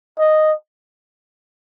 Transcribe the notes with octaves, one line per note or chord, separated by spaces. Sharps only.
D#5